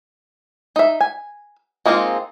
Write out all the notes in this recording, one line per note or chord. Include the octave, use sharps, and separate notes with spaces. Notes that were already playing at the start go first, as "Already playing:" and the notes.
D#4 E5
G#5
G#3 A#3 C4 D#4 F4